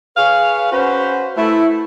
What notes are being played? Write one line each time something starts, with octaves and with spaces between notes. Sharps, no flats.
G#4 B4 C#5 F5
C#4 F#4 B4 C5
A3 E4